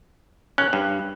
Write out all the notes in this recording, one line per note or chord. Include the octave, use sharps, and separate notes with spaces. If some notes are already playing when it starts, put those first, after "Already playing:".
C#4 F#6
G2